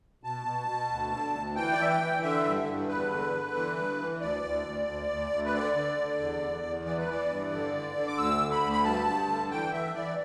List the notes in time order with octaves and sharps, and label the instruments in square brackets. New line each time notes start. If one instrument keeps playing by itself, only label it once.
[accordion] B2 A5
B2
B2
D2
D3
D2
E3 G5
D5
E3 E5
G5
E3
D3 E5
G2
G2
E2 B4
D3
D3
E3
G2
E3
D2 D5
D2
D2
D2
D2
D2
B4
D3 D5
D3
D3
E2
E2
E2
E3 D5
B4
E3 D5
G2
D3
D3
D3
D6
D2 E6
D3
B5
D2
B5
G2 A5
G2
D3
E3 G5
E3 E5
E3 D5